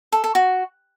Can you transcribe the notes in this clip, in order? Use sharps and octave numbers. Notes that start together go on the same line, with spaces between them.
A4
A4
F#4